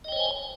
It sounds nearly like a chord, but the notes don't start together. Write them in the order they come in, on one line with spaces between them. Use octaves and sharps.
D#5 G5 C#5 C5 G#5